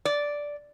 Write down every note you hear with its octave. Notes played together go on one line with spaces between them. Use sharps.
D5